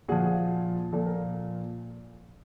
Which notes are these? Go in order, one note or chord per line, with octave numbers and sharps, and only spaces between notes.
A#2 F3 F#4 G#4
A#2 F3 A4
A#4